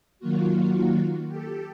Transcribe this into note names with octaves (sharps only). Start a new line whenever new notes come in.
D#3 F#3 A#3 F4 F#4
G4 A4